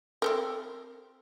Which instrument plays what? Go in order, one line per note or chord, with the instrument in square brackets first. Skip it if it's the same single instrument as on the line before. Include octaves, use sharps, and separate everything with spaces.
[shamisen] C4 A4 A#4